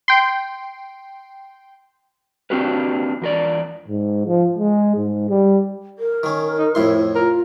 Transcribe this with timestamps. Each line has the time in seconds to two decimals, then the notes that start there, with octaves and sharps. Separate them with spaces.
0.08 G5 C6
2.50 C4 D4 F#4 G4 A#4 B4
3.22 E2 A#4 D5
3.88 G#2
4.26 F3
4.58 G#3
4.96 G#2
5.30 G3
5.99 A#4
6.23 D#3 C#4
6.57 D#4
6.75 F2 A2 E4 C6
7.15 F4 A#4